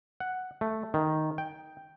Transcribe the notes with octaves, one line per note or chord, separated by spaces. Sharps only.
F#5
A3
D#3
G5